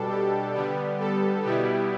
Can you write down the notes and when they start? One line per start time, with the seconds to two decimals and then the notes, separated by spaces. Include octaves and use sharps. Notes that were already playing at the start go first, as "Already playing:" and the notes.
Already playing: B2 G3 D4 A4
0.09 G4
0.54 D3 G3 B3 G4
0.99 A4
1.44 B2 G3 B3 E4 G4